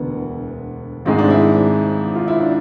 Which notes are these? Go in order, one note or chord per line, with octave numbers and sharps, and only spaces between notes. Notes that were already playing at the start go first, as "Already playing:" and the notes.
Already playing: E1 D2 D3 B3
G#1 G#2 G#3 C4
D4
E4
F4
E4
D4